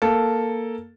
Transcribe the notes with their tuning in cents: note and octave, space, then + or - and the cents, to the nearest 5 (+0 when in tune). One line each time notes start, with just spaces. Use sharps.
A#3 +0 A4 +0